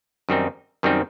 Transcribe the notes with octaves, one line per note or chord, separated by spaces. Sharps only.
F#2 D#3 G3 C4 D#4
F#2 D#3 G3 C4 D#4